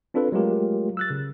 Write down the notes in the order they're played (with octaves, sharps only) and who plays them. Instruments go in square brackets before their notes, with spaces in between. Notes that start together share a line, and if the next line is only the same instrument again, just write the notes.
[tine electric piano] C4 D4 F4 A4 B4
F#3 G#3 A3 F4 G4 A#4
E6 F#6 A6
C#3